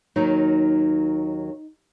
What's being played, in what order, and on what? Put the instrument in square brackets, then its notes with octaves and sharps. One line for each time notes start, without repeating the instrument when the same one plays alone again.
[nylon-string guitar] D#2 D#3 F#3 D#4